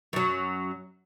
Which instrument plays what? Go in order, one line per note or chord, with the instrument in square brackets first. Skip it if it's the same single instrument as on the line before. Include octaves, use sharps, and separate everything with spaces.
[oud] F#2 F#3